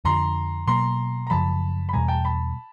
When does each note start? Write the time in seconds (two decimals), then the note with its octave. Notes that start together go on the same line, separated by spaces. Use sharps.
0.05 F2 D3 F3 A#5 C6
0.67 B2 F#3 A#3 A#5 C6
1.27 A#5
1.30 F#2 C#3 F3 A5 B5
1.89 B5
1.93 E2 B2 G3 G#5 A#5
2.08 G5 A5
2.25 A5 B5